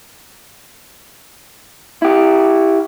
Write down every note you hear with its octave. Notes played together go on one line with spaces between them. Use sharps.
E4 G4